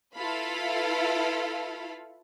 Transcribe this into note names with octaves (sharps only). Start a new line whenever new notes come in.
E4 F4 A4 B4 F5 B5